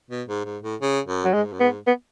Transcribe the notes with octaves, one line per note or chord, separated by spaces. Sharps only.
B2
G#2
G#2
A2
C#3
F#2
F#3
G#2 G#3
F#2
G#2 B3
B3